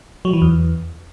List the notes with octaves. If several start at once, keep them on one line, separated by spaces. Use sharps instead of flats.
F#3
E3
E2